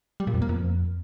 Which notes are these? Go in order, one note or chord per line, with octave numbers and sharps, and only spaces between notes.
G3
A#2
F2
A#3
F2